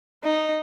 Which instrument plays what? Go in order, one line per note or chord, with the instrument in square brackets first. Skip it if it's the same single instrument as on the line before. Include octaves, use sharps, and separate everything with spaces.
[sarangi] D#4